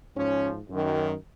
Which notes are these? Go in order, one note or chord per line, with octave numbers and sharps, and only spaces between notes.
G#2 F3 C#4
F#2 D#3